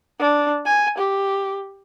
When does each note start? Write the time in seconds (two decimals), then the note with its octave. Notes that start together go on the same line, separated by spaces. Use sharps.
0.19 D4
0.66 G#5
0.98 G4